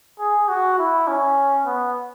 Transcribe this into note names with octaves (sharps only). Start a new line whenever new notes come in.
G#4
F#4
E4
C#4
B3